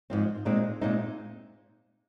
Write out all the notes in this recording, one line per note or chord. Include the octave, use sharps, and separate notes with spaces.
G#2 F3 C4
A#2 G#3 C4 D#4
A#2 G#3 C4 D#4